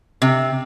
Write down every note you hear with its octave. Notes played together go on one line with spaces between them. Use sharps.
C3